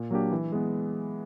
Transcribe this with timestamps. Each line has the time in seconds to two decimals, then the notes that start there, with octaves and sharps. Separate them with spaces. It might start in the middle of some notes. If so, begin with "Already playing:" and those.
Already playing: A#2
0.11 F#3 A#3 D4 G4
0.32 E3
0.52 G#3 B3